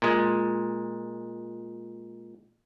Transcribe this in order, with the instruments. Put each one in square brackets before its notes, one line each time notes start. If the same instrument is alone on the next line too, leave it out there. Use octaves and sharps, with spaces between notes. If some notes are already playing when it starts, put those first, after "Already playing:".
[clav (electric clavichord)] A#2 G#3